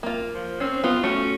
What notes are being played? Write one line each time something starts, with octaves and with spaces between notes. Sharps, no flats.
A#3 F4
F3
C4 C#4
B3 F4
A3 C#4 F#4